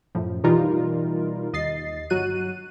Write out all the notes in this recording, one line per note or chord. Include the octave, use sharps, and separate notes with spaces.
F#2 A2 F3
B2 E3 G3 D#4 F4 A#4
D#2 D#5 A6 C7
G1 F#3 F#4 F#6 D#7